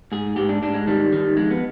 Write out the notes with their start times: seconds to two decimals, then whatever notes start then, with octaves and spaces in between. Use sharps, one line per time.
0.12 G#2 G#4
0.36 G#2 G4
0.49 D4
0.62 G#2 D4
0.74 G#3
0.87 D#3 G3
1.13 D#3
1.37 F2 G#3
1.50 B3